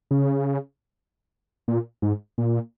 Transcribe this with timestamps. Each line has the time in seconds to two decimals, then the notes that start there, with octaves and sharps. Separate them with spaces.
0.11 C#3
1.68 A#2
2.02 G#2
2.38 A#2